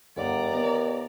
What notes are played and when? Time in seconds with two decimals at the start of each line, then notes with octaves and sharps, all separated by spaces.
0.16 G1 D#2 D5 F#5 A#5
0.53 B3 A#4